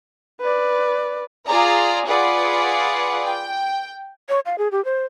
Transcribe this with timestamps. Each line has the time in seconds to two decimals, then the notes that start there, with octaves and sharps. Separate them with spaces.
0.41 B4 D5
1.46 F4 G#4 D5 A#5
2.04 F4 G#4 B4 D5 F#5
3.26 G5
4.29 C#5
4.46 F5
4.58 G#4
4.71 G4
4.85 C5